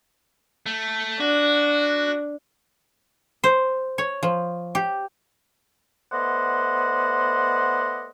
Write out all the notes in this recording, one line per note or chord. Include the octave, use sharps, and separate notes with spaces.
A3
D4 F#4
C5
C#5
F3
G4
A3 B3 C5 D5 D#5 F#5